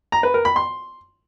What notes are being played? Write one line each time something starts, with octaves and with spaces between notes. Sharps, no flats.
A#5
B4
A#4
B5
C6